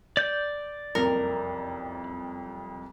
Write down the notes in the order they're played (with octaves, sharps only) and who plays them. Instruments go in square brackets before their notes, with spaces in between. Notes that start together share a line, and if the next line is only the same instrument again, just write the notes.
[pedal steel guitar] D5 G6
[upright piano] F#1 C2 F2 [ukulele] A#4